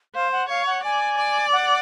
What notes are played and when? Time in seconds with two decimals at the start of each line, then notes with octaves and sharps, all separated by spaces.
0.15 C5 F5
0.32 F#5
0.49 C#5 F5
0.66 F#5
0.83 D5 G#5
1.18 D5
1.53 F#5